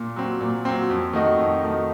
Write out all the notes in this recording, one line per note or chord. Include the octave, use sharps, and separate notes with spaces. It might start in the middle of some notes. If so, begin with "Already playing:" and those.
Already playing: A#2
F#3 C4
A#2
F#3 C4
F2
D#3 A3 D#4 F#4
F2
D#3 A3 D#4 F#4